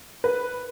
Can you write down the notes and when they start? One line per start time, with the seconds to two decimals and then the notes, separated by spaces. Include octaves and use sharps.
0.24 B4